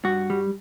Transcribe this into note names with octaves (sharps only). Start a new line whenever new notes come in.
G2 F#4
G3